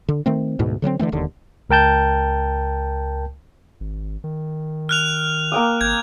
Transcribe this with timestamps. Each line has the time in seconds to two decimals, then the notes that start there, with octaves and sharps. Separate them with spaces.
0.08 D3
0.26 D#3 A3 C4
0.59 D2 G#2 B2
0.82 D3 F#3 G3 C4
0.99 D3 E3 A3 C4
1.12 E1 D#2 D3
1.70 C#2 A#4 G5 A5 G6
3.80 G#1
4.24 D#3
4.89 F6 F#6 F7
5.52 A#3 G5 D#6
5.81 G#1 G6 G#6